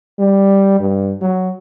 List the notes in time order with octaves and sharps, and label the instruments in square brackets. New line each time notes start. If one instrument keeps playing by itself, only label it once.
[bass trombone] G3
G2
F#3